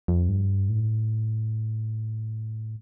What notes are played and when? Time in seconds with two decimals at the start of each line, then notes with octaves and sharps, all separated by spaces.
0.08 F2
0.28 G2
0.69 A2